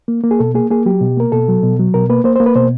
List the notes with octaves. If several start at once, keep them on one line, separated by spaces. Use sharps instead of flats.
A#3
A#3
G#4
B2 A4
A#3 G#4
A#3 G#4
F#3 G4
B2
A#3 A#4
B2 A4
F#3
B2
F#3
B2 A#4
A#3 B4
A#3 C5
C5
A#3
B4
B2 C5